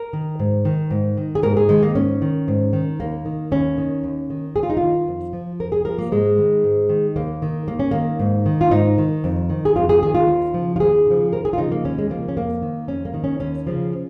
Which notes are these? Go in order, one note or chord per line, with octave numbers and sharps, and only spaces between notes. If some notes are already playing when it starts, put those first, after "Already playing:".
Already playing: A#4
D#3
G#2
D#3
G#2
D#3
G#4
G#2 A#4
G#4
D#3 G#3
A#3
G#2 C#4
D#3
G#2
D#3
D#2 A#3
D#3
D#2 C#4
D#3
D#2
D#3
D#2 G#4
F4
D#4
D#3 F4
F2
F3
F2 A#4
G#4
F3 A#4
A#3
G#2 G#3
D#3
G#2
D#3
D#2 A#3
D#3
D#2 A#3
C#4
D#3 A#3
G#2
D#3
F4
G#2 D#4
D#3
F2
D#3
G#4
F2 F4
G#4
D#3 G#4
F4
D#2
C#3 F3
F4
D#2 G#4
C#3 F3
D#2 A#4
G#4
F4
C#3 F3 D#4
A#3
D#2 C#4
G#3
C#3 F3 A#3
C#4
F2 A#3
D#3
F2 C#4
A#3
D#3
C#4
D#2 C#4
C#3 F3